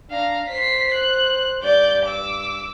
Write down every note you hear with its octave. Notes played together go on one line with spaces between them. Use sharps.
D4 F5 A#5
C5 B6 C7
F#6
G2 D5 G6
D6 E6